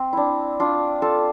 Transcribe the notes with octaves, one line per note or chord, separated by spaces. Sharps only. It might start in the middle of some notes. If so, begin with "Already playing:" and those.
Already playing: C4
D4 E4
D4 F4
F4 A4